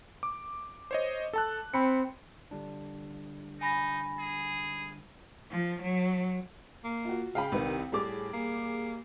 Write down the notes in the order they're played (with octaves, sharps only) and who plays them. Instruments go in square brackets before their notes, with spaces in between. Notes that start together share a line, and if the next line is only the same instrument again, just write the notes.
[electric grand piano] D6
C5 C#5 D#5
A4 A5 F#6
[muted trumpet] C4 [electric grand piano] B5 C#7
[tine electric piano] D3 G3 D4
[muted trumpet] D#4 [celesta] G#5 B5 A#6
[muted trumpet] G#4
[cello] F3
F#3
[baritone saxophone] A#3
[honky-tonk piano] F4 F#4
[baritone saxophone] C#3 [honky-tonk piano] F5 G5 B5
[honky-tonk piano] C2 B4 [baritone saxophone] D#3
[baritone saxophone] A2 [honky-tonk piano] G3 G#4 D6
[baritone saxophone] A#3